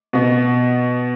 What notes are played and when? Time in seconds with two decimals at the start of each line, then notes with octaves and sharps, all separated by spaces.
0.13 B2 B3